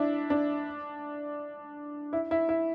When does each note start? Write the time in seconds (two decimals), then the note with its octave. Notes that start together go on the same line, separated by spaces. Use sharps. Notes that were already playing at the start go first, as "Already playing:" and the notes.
Already playing: D4 E4
0.30 D4
2.13 E4
2.31 E4
2.49 E4